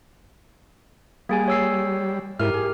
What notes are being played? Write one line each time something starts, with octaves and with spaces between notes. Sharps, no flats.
G3 A#3 G#4 G#5
C#5 E6 C7
G#2 E4 G4 A#4 F6
G#4